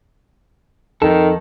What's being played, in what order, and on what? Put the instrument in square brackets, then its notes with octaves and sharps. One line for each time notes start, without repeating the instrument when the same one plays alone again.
[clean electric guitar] F2 A4 [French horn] D#3